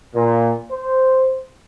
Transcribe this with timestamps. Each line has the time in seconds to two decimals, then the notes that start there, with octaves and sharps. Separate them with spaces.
0.14 A#2
0.71 C5